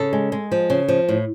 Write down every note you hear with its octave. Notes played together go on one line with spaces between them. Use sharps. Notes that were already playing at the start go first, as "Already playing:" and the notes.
Already playing: C#3 A4
G#3
G#3
F3
C#3
F3
A2